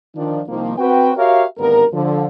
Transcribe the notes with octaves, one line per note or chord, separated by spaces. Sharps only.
D#3 F3 D4
C2 D#3 F3 A#3
C4 F#4 B4 G5
F#4 G4 A#4 C#5 E5 F5
G#1 D2 G2 B3 A#4
D3 F3